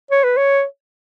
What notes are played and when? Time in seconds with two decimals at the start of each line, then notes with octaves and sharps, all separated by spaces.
0.11 C#5
0.24 B4
0.37 C#5